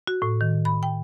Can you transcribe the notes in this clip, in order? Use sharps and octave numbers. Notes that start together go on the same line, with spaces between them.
F#4
A2
D#3
B5
G5